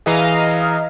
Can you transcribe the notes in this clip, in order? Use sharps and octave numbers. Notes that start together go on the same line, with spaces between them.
E3 G#4 D#5 F5 A#5